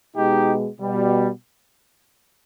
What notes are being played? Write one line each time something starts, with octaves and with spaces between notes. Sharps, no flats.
B2 G#3 D#4 G4
B2 G3